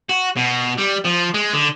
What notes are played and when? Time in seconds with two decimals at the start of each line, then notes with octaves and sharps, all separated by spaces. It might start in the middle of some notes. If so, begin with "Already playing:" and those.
0.09 F#4
0.36 B2
0.78 G3
1.05 F3
1.34 G#3
1.53 D3